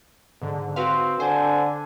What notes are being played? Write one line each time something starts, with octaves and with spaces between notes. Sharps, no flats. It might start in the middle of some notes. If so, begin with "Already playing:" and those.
G#2 D3
C4 F#4 B4 F5
D3 C5 G#5